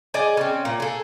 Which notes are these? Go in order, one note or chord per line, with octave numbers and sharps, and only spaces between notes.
G#4 D5 D#5 G#5
C4 C#4
A#2
G#4 A4